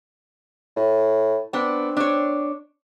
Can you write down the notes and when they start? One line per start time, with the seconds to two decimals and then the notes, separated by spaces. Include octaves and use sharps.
0.76 A2
1.53 B3 C4 D4
1.97 D4 C#5